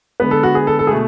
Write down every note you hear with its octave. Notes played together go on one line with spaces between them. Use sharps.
D3 G#3 B3 B4
A4
F#4
G#4
A4
A4
G#4
B2 A3